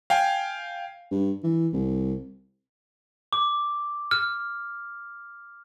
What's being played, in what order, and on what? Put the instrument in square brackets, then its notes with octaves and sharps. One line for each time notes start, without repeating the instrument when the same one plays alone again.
[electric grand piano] F5 G5 G#5
[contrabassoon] G2
E3
C2
[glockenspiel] D6
F6